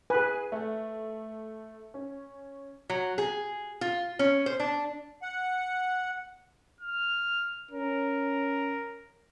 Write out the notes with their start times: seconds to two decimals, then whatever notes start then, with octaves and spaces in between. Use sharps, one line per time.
0.10 G#4 B4 G#5
0.52 A3
1.94 C#4
2.90 F#3
3.18 G#4
3.81 F4
4.19 C#4
4.46 C5
4.60 D4
5.22 F#5
6.81 F6
7.71 C#4 A#4